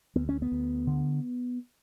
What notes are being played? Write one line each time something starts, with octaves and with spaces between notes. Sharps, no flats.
D2 B3
C#4
B3
D2
D3